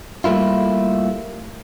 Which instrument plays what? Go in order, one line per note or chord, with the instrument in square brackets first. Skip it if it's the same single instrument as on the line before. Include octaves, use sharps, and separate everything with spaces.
[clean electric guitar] G3 A3 A#3 E4 F4